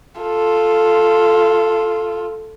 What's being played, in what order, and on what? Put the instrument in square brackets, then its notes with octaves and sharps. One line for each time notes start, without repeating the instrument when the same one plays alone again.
[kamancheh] F4 A4